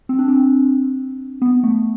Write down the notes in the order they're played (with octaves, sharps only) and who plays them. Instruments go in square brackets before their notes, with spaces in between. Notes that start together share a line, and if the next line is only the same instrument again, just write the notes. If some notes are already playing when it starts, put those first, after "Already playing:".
[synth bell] C4
D4
C4
B3
A3